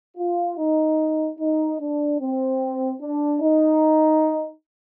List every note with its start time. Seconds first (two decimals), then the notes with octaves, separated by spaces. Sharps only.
0.17 F4
0.58 D#4
1.40 D#4
1.80 D4
2.20 C4
3.02 D4
3.42 D#4